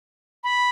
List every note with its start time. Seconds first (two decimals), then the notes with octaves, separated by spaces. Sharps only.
0.44 B5